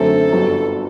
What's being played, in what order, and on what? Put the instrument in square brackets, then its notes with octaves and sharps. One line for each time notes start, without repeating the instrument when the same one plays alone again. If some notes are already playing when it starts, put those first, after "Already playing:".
Already playing: [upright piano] F#2 D3 A3 C4 [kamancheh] A4
[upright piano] G1 G2 F#3